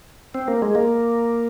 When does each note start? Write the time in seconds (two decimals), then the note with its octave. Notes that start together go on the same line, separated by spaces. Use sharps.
0.34 C4
0.48 A#3
0.62 G#3
0.75 A#3